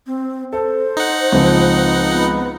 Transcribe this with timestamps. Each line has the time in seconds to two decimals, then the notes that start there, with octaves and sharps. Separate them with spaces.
0.07 C4
0.53 A4 C5
0.97 D#4 F#5
1.32 C#2 F3 C4
2.13 B3